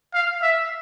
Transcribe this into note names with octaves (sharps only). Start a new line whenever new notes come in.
F5
E5